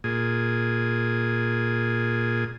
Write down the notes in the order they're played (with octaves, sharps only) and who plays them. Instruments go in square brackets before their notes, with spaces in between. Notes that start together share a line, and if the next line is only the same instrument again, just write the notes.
[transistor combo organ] A#2 G#4